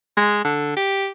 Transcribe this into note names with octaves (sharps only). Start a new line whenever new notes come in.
G#3
D3
G4